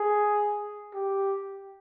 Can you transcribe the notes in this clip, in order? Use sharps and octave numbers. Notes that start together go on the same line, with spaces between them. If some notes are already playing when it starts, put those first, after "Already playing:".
Already playing: G#4
G4